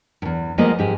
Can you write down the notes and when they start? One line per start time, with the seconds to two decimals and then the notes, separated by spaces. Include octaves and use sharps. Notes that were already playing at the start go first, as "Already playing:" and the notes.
0.22 E2 G2
0.58 F3 G3 G#3 A#3 B3 D#5
0.79 G#2 G4 G#4